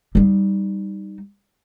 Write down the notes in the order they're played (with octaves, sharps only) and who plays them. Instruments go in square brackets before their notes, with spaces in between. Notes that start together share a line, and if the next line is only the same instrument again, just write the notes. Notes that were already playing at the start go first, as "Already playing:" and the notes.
[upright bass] G3 D#4